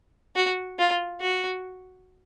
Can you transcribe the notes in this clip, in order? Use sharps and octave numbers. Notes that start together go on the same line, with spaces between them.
F#4
F4
F#4